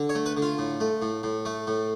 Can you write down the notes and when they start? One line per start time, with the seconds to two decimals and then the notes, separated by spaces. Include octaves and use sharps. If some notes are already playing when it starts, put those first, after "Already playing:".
Already playing: D3
0.09 C#5
0.15 A3
0.26 B4
0.37 D3
0.42 F4
0.58 A2
0.80 A3
1.02 A2
1.23 A2
1.45 A3
1.67 A2